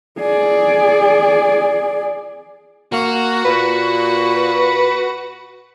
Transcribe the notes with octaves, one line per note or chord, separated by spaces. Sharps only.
G#4 D5
A#3 F#4
A#2 B4